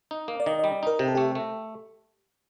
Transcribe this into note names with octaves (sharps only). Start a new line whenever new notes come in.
D#4
A#3
D5
D#3 D#5
D#5
G3
D#4 A#4
C3 G4
A4
A3 G4
A3